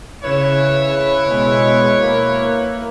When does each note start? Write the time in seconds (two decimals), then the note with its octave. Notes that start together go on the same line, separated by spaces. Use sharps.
0.24 C#3 E4 B4 C#5 E7
1.27 B2 G#3
2.00 A#3